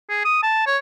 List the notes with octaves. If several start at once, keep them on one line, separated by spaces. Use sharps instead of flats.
G#4
D#6
A5
C#5